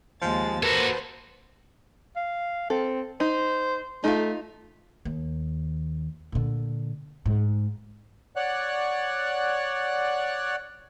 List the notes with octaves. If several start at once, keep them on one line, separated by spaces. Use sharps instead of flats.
D#2 F3 G#3 A6
A#3 F#4 A4 B4 C5
F5
C4 A4
D#4 C5
A3 D#4 F4
D#2
A#2 D3
G#2
C#5 D5 F#5 F#6